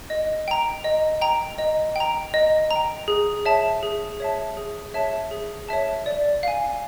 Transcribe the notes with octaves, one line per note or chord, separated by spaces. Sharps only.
D#5
G5 A#5
D#5
G5 A#5
D#5
G5 A#5
D#5
A#5
G5
G#4
C#5 E5 A5
G#4
C#5 E5 A5
G#4
C#5 E5 A5
G#4
C#5 E5 A5
D5
F5 G#5